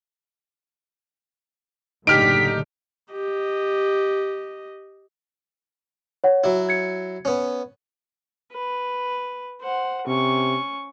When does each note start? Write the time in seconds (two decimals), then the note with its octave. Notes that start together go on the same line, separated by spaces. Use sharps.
2.07 F#1 A2 D3 D#4 G4 F6 B6 D7
3.11 G4 D#5
6.24 C#5 F#5
6.44 F#3 E4
6.69 G#6 C#7
7.25 B3 C#4
8.52 B4
9.61 C5 F#5
10.07 C3 C#4 C#6